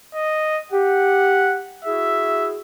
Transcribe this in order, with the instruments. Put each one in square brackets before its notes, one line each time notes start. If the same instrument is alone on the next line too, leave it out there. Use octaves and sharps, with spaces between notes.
[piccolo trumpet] D#5
[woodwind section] G4 [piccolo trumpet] F#5
[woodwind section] E4 F#4 G#4 [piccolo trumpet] E5